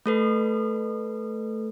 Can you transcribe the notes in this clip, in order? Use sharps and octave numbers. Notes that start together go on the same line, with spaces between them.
A3 A4 B4